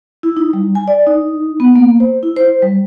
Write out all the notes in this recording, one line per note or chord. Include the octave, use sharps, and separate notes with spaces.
E4
D#4
G3
G#5
D5
D#4
B3
A#3
C5
E4
C5
G3